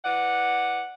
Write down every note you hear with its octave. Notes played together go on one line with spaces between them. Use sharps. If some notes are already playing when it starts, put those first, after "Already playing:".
E3 D5 F#5